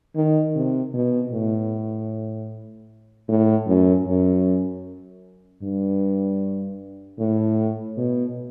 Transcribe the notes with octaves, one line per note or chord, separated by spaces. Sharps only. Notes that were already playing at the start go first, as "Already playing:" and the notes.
D#3
C3
B2
A2
A2
F#2
F#2
G2
A2
B2